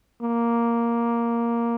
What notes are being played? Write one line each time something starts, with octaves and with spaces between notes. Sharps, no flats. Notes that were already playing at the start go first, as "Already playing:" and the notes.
A#3